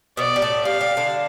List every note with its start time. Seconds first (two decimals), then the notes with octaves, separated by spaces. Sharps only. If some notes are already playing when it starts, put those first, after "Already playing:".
0.17 B2 B3 D5
0.36 G3
0.42 A2 A3
0.65 G3 F5
0.81 G3
0.97 D3 D4